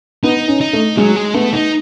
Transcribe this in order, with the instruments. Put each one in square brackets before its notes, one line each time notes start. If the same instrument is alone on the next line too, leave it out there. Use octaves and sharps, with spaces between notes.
[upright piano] B3 [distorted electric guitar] D#4
[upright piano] C#4
[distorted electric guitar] D#4
[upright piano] A3
[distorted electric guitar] F#3 [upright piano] G#3
[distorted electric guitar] G#3
[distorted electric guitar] A3 [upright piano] B3
[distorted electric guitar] D#4